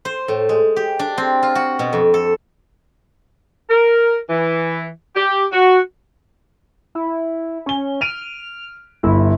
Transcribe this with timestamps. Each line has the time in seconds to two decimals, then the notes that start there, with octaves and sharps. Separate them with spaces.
0.05 C5
0.28 A2
0.49 G#3
0.76 G4
0.99 D4
1.18 C4
1.43 F4
1.55 F#4
1.79 B2
1.93 F2
2.14 A4
3.70 A#4
4.29 E3
5.16 G4
5.52 F#4
6.95 E4
7.66 C#4 G#5 G7
8.01 F6 D7 D#7 F7
9.03 G1 E4